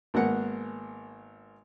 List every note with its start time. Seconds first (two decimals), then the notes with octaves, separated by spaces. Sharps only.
0.14 G#1 A#3 B3 A#4 F#5